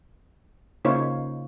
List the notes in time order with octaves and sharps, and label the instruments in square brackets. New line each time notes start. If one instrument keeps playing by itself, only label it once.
[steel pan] C#3 A#3 D#4 F4 C5 C#5